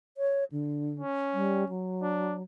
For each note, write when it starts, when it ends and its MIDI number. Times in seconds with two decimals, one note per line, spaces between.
0.17 0.44 73
0.52 1.01 50
0.99 1.69 61
1.33 1.65 55
1.69 2.42 54
2.02 2.36 62